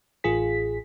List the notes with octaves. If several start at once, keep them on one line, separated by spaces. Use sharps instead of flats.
A1 F4 G#4 B6